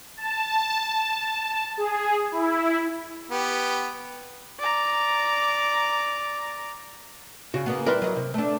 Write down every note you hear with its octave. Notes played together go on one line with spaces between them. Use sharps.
A5
G#4
E4
B3 G4
D5 A#5
C#3 F#4
C#3 A#3 B3
G3 E4 A#4 B4 C6
F#3 D#5
C3
A3 D4